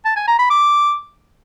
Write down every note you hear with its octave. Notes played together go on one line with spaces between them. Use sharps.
A5
G#5
A#5
B5
D6